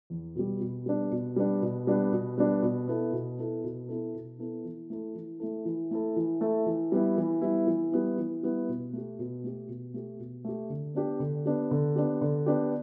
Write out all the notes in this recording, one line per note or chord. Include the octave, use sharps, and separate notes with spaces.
E2
B2 G3
B2
G3 B3 D4
B2
G3 B3 D4
B2
G3 B3 D4
B2
G3 B3 D4
B2
B3 E4 A4
B2
B3 E4 A4
B2
B3 E4 A4
B2
B3 E4 A4
E3
A3 E4 A4
E3
A3 E4 A4
E3
A3 E4 A4
E3
A3 E4 A4
E3
G3 B3 E4
E3
G3 B3 E4
E3
G3 B3 E4
E3
G3 B3 E4
B2
A3 G4
B2
A3 G4
B2
A3 G4
B2
A3 G4
D3
B3 D4 G4
D3
B3 D4 G4
D3
B3 D4 G4
D3
B3 D4 G4